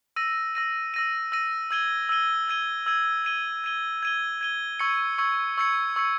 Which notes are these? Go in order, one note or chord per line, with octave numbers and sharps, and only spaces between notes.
E6 A#6 D#7
E6 A#6 D#7
E6 A#6 D#7
E6 A#6 D#7
E6 G#6 D#7 G7
E6 G#6 D#7 G7
E6 G#6 D#7 G7
E6 G#6 D#7 G7
G#6 D#7 G7
G#6 D#7 G7
G#6 D#7 G7
G#6 D#7 G7
C#6 E6 G#6 C#7
C#6 E6 G#6 C#7
C#6 E6 G#6 C#7
C#6 E6 G#6 C#7